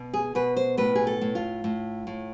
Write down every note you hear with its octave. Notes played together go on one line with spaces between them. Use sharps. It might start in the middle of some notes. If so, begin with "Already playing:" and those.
Already playing: B2
G#4
B2 B4
C5
A2 B4
G#4
A4
A2
F4
A2
A2